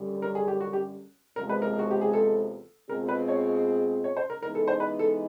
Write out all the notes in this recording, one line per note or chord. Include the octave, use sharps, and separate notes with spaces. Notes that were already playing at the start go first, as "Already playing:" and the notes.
Already playing: F#2 D3 G3
A#4
G#4
G4
F#4
G4
E2 C3 F3 G#3 B3 A#4
B4
A#4
F#4
G4
G#4
A4
B2 G#3 C4 F4 G#4 A#4
B4
C#5
C#5
C5
A#4
E3 G#3 B3 D#4 A#4
A4
C5
B4
A4